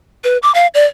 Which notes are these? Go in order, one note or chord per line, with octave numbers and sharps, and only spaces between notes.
B4
D6
F5
D5